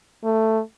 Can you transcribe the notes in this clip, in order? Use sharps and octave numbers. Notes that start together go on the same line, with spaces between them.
A3